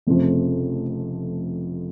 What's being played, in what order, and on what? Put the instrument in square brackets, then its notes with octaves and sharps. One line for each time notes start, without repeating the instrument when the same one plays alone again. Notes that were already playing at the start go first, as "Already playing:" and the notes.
[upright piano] F1 F2 C#3 F3 A3